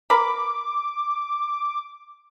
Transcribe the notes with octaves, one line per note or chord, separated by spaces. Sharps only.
A#4 B5 D6